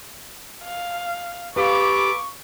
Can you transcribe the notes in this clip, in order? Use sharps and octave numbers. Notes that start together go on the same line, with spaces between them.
F5
G4 A4 B4 F5 B5 C#6 D6